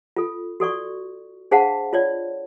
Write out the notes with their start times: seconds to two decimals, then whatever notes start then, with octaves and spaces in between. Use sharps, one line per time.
0.16 F4 A4
0.60 F#4 A4 D5 C#6
1.51 D4 G#4 C5 F5 F#5 A5
1.93 F4 C#5 D5